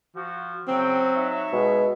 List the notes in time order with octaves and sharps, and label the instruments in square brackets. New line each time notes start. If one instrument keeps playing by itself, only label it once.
[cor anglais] F3 [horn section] F#4
[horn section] C#3 E4 G5 [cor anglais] F#3 [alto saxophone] C4
[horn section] D#4 C#5 E5
[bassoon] B2 [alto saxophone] G#3